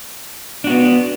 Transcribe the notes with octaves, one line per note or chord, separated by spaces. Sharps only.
B3 D4 F#4